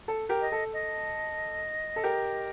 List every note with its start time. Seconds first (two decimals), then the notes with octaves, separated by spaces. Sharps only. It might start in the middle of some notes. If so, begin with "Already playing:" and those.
0.08 A4
0.29 G4 A#4
0.41 D#5
0.52 A4
0.73 D#5
1.96 A4
2.04 G4 A#4